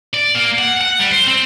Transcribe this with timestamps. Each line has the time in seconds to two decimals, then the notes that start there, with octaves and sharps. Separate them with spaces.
0.13 D5
0.35 A#3
0.59 F#5
0.81 F#5
1.00 G3
1.12 C5
1.27 C4